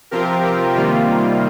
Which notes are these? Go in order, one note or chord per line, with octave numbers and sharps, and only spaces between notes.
C3 F3 C4 F4 G4 A#4
G4
C3 D#3 G3 A#3 F4